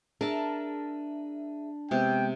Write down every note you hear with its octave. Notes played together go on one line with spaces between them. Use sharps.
D4 G#4 A#4 E5 A5
C3 G#3 B3 G5